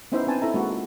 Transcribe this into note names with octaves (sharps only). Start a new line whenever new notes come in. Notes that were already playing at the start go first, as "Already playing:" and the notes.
B3 C#4 D#4 E4 C5 E5
C4 D4 B4 C5 G#5 A5
D#4 E4 A4 E5 A#5
G#3 A#3 F#4
F4